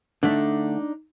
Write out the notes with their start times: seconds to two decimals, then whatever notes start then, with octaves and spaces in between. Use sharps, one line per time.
0.23 D3 A3 D4 D#4